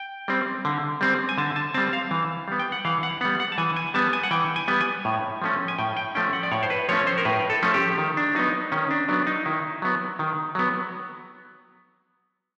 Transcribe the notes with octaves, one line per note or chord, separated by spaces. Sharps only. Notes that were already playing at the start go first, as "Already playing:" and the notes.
Already playing: G5
G3 C4
D3
G3 C4
G#5
D3 A5
A5
G3 C4 A5
F5
E3
G3 B3
G5
F#5
E3 F5
F#5
G3 B3 F#5
F#5
A5
E3 G#5
G#5
G3 B3 A5
G#5
F#5
E3 G5
G#5
G3 B3
G#5
A2
F3 A3 C#4
G#5
A2 G5
G5
F3 A3 C#4 G5
F#5
D5
A2 C#5
C5
B4
F3 A3 C#4 C#5
C5
A#4
A2 B4
A4
F3 A3 C#4
G4
D#3
D4
F#3 B3 D#4
D#3 C#4
D4
F#3 B3 D4
D#4
D#3 E4
F#3 B3
D#3
F#3 B3